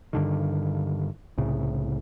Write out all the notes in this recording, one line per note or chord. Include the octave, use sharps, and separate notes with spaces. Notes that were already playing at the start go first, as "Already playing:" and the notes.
G2 D3 D#3
C2 A2 C#3